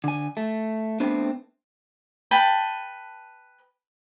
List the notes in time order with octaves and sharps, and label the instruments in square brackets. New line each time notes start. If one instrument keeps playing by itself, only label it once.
[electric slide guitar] D3 G#5
A3
A3 B3 C4 D4
[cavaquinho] B4 G5 A5